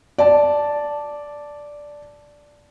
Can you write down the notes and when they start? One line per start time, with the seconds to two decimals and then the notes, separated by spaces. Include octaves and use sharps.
0.18 D5 A5